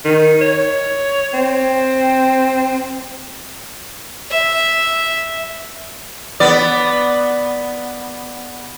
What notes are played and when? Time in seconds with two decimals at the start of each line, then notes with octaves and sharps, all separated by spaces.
0.05 D#3
0.41 C#5
1.34 C4
4.31 E5
6.40 B3 D5